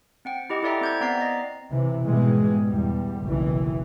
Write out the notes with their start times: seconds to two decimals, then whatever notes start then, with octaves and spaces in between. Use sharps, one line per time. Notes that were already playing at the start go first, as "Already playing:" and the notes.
0.25 C4 F#5 G5
0.50 E4 G4 D#5 F#5 D6
0.63 E4 A4 D5 E5 G5 A#5
0.81 C4 G6 G#6
1.01 B3 C4 D5 A#5 B6 C7
1.21 D#5
1.70 C3 E3
2.04 G#2 B2 E3 G3 G#3
2.68 E2 G3
3.23 F#1 B1 E3